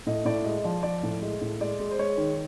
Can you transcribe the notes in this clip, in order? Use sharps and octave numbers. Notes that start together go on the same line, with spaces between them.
A2 D#5
A2 D5
G#3 D#5
D#5
F3 D5
F3 D5
A2
G#3 D#5
A2
G#3 D5
G#3
C5
G#3 C#5
D#3